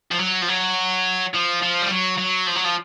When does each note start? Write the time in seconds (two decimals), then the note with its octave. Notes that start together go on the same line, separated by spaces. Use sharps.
0.11 F3
0.20 F#3
0.42 F3
0.48 F#3
1.34 F3
1.62 F3
1.81 G3
1.90 F#3
2.18 F#3
2.47 F3
2.56 F#3
2.65 F3